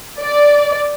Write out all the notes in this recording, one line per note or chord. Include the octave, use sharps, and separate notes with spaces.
D5